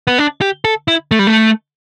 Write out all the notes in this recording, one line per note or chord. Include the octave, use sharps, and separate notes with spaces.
B3
D4
G4
A4
E4
A3
G3
A3